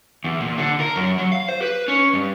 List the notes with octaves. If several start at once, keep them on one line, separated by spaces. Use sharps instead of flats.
E2
A#2
D3
A#4
F#2
F#3
F5
C5
B4
C#4
G2